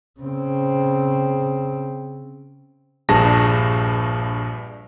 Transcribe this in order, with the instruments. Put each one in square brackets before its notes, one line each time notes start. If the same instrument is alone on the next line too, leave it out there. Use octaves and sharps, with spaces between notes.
[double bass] C#3 C4
[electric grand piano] A#1 G2 G#4 A5 A#6